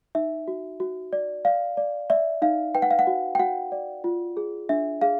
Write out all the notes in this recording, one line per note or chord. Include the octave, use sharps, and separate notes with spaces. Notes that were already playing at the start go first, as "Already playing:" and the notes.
D#4 E5
F#4
F#4
D5
D5 F5
D5
D5 E5
D#4 F5
B4 G5
F#5
F5
F#5
F#4
G5
F#4 F#5
D5
F4
G#4
D4 E5
G#4 F5